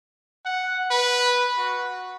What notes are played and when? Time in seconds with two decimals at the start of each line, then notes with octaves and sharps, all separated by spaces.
0.45 F#5
0.91 B4
1.57 F#4